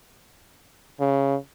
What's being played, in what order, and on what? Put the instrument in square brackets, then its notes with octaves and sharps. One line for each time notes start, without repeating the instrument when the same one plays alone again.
[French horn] C#3